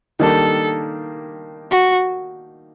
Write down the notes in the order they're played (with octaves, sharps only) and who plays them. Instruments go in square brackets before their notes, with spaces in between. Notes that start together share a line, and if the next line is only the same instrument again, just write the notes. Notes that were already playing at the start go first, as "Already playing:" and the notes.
[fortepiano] D#3 G3 A#3 D4 [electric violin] A4
[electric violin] F#4